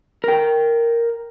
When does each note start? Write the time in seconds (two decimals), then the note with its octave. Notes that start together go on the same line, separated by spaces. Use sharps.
0.24 A#4 G5